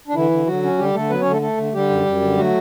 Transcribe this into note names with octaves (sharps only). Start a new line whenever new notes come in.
D4
D3 E3 E4
D3
D3 F#3 F#4
C#4
D3 G3 G4
D3 A3 A4
F#3 B3 B4
D3 C#4 C#5
A3 A4
A3 A4
D3
D3 G3 G4
F#2
F#2
D3
F#3 A3 F#4